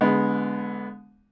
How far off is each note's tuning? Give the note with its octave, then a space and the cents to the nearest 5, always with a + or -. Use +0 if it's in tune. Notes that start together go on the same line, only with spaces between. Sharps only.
D3 -25 G#3 +0 B3 +0